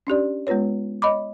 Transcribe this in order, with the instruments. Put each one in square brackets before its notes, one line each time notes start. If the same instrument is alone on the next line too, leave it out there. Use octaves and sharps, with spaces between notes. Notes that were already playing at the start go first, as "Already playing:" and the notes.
[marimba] C#4 D4 G4 D5
G#3 B3 F4 B4 C#5
C#5 D#5 B5 D6